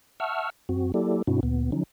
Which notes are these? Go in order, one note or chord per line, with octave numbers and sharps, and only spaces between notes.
E5 F#5 A5 C#6 E6 F6
F#2 C4 F#4
F#3 A#3 E4 G4 A4 D5
G2 B2 C4 D4 E4 F#4
D2 A#2 B3
D3 F3 F#3 C#4 D#4